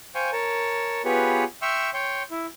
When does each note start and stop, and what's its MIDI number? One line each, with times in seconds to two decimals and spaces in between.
0.15 0.31 72
0.15 0.31 77
0.15 0.31 79
0.15 0.31 80
0.15 0.31 85
0.32 1.02 70
0.32 1.02 73
0.32 1.02 81
1.05 1.44 59
1.05 1.44 65
1.05 1.44 67
1.05 1.44 68
1.05 1.44 71
1.05 1.44 73
1.62 1.90 76
1.62 1.90 79
1.62 1.90 84
1.62 1.90 85
1.62 1.90 88
1.62 1.90 89
1.94 2.23 73
1.94 2.23 79
1.94 2.23 84
2.31 2.46 64